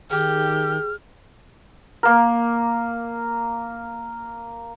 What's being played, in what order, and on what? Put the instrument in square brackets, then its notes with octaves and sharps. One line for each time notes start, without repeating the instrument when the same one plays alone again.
[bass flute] D#3 [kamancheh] G4 [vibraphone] G#4 [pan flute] F6
[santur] A#3 A#4